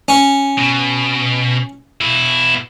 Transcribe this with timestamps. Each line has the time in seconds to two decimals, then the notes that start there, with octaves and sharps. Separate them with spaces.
0.08 C#4
0.58 B2
2.01 B2 E4